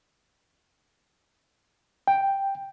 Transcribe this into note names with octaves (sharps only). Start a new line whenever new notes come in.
G5